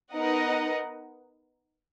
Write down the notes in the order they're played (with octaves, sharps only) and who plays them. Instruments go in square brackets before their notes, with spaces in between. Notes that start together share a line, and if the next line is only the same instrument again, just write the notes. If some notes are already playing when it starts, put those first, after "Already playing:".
[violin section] B3 D#4 A#4 D#5 F#5